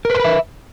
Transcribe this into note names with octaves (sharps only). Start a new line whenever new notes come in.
A#4 B4 E5 B5 C6